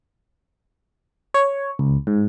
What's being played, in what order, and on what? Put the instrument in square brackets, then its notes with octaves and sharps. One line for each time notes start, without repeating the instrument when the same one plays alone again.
[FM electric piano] C#5
C#2
G#2